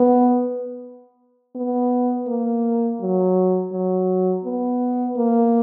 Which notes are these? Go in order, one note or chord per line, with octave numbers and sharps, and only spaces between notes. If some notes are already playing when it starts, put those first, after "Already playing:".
Already playing: B3
B3
A#3
F#3
F#3
B3
A#3